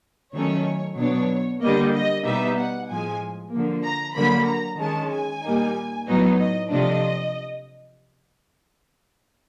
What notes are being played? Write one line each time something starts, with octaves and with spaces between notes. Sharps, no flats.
D#3 F#3 A3 C#4 C#5
B2 F#3 B3 D4 C#5
D3 G3 A#3 D#5
D#5
B2 G3 B3 D#4 E5
F#5
A2 F3 G#3 G#5
D3 F3 A#3
A#5
D3 F#3 A#3 B5
A#5
D#3 G#3 C#4 A5
G#5
A#2 G3 A#3 D#4
A2 F#3 B3 D#4
D#5
C3 F3 A3 D4 D#5